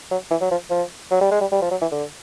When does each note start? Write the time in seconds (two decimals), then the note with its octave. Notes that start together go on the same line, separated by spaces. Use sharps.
0.11 F#3
0.31 E3
0.41 F#3
0.51 F3
0.71 F3
1.11 F#3
1.21 G3
1.31 G#3
1.41 G3
1.52 G3
1.62 F3
1.71 F#3
1.81 E3
1.92 D3